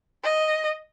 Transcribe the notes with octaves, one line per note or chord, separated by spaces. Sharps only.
D#5